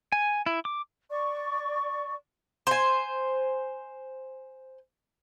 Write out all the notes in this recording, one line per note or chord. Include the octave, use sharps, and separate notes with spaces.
G#5
E4
D6
D5 C#6
C5 G#5